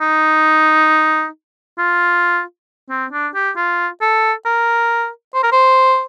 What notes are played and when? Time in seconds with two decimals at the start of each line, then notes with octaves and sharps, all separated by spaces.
0.01 D#4
1.79 F4
2.90 C4
3.12 D4
3.35 G4
3.57 F4
4.02 A4
4.46 A#4
5.35 C5
5.44 A#4
5.52 C5